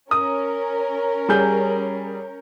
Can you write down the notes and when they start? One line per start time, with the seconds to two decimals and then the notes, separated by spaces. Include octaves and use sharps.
0.11 C#4 A#4 D#6
1.29 G3 G#4 G6